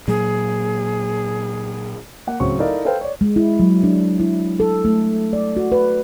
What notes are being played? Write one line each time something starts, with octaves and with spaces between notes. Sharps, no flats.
A#2 F#3 A#3 G#4
A#3 F#5
D1 C#3 F#3 C4 C#6
D#4 E4 A4 A#4 D5 F5
A4 B4 C5 F5 G5
C#5 D5
G#3
E4
F#3
D4
E4
A4
A3
D5
F#4
B4